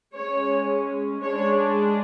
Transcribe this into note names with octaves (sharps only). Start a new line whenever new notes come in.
G#3 C#4 C#5
G#3 D4 C#5